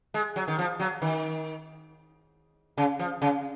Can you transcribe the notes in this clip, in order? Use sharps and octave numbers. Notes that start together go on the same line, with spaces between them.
G#3
F#3
D#3
F3
F#3
D#3
C#3
F3
C#3